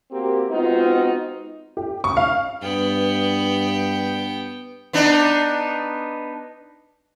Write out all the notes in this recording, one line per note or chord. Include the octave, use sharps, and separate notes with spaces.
A#3 C4 F#4 G4
G#3 B3 C4 D#4 F4 F#4
G4
C#6
F5
G2 B3 G5
B3 D4 D#4